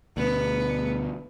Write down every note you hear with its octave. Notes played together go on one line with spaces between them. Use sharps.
D2 B2 B3